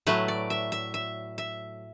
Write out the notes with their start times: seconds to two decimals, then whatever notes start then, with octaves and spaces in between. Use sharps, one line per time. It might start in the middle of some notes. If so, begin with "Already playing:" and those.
0.06 A2 F#3 A3 B4
0.28 D5
0.50 E5
0.72 E5
0.94 E5
1.38 E5